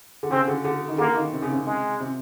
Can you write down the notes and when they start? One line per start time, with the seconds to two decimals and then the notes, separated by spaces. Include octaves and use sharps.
0.23 D3
0.31 C#3 C4
0.48 D3
0.65 D3
0.88 D#3
0.98 D3 A#3
1.16 D#3
1.33 C3
1.42 C#3
1.52 C3
1.66 G#3
2.00 C3